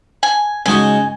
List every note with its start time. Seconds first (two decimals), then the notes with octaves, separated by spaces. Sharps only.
0.23 G#5
0.66 C#3 G#3 D#4 F#4 G#5